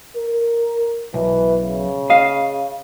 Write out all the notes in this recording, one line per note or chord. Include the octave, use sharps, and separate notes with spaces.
A#4
B1 E3
C#3
D#5 F5